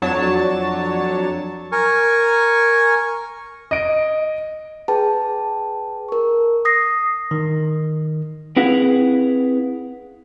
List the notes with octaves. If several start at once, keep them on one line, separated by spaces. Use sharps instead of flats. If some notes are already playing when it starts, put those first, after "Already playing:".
F2 F#3 D4 C#5 A5
A#4 G#5 C#6
D#5 D7
G#4 B4 G5 A5
A#4 C#6
D#6 A#6 C7
D#3
C4 E4 G#4 B4 F5 F#5